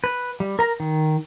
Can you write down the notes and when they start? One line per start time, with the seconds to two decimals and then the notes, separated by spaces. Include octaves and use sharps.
0.04 B4
0.40 G3
0.59 A#4 A#5
0.80 D#3